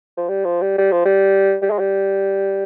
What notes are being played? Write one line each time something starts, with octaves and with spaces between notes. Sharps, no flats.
F3
G3
F3
G3
G3
F3
G3
G3
G#3
G3